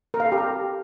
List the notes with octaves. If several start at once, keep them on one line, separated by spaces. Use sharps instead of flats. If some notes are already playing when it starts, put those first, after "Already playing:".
A#4
F5
A4
G4
A#5